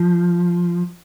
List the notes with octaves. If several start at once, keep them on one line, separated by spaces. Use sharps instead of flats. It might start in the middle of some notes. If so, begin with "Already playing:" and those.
Already playing: F3